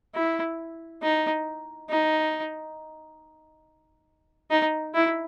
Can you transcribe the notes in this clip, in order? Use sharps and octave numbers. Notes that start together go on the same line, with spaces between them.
E4
D#4
D#4
D#4
E4